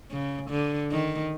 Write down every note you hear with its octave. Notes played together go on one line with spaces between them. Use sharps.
C#3
D3
D#3